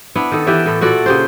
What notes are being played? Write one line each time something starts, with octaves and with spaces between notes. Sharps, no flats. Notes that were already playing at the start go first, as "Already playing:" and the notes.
B3 D4 E4
D#3 A4
E3 G4 D5 E5
A2 A4
A#2 F#4 A4 D5
C#3 G4 C5